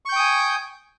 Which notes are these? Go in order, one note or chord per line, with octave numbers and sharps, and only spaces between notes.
G5 G#5 C#6 D#6 G6